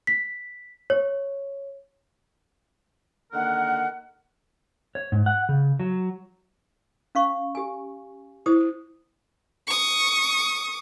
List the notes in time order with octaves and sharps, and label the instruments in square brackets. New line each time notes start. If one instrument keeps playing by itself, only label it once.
[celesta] B6
C#5
[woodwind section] D3 D#3 A#3 A#4 F#5
[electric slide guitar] C#5
G#2
F#5
C#3
F#3
[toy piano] C#4 F5 C#6
G4 G#5
[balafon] E4 [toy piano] C5 D#6
[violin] C#6 D#6